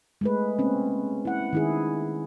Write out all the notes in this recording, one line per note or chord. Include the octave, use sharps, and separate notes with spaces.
G#3 A3 B4
A#3 C4 C#4
E4 F#5
D#3 E4 G#4